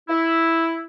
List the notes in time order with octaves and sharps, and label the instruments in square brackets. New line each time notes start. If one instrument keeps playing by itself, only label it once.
[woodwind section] E4